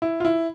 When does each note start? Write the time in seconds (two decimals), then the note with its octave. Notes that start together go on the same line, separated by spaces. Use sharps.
0.02 E4
0.20 F4
0.25 E4